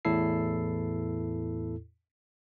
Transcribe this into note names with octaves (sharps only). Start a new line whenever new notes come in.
E2 A2 E4 A4 C7